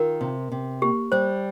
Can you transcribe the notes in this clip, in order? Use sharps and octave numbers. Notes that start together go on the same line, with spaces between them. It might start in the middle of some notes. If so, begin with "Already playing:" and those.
Already playing: D#3 F4 A#4
C3
C3
A#3 G4
G3 C5